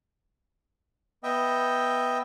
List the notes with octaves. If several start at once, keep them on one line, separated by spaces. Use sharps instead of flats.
B3 D#5 E5 G5